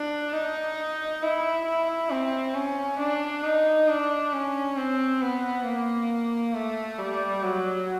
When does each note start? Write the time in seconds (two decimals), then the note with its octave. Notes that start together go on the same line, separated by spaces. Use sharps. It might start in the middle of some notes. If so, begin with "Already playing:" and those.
Already playing: D4
0.33 D#4
1.23 E4
1.66 E4
2.10 C4
2.55 C#4
2.99 D4
3.44 D#4
3.88 D4
4.33 C#4
4.77 C4
5.21 B3
5.66 A#3
6.54 A3
6.99 G3
7.43 F#3